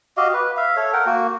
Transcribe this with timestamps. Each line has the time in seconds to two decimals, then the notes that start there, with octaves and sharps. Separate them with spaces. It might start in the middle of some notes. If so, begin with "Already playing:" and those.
0.17 F#4 G4 D#5 F5
0.34 B4
0.57 E5 F5
0.76 A4 C#5
0.93 A#4 F#5 G5
1.06 A#3 F#4